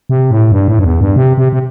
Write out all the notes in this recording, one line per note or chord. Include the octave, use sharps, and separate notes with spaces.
C3
A2
G2
A2
G2
E2
G2
C3
C3
C3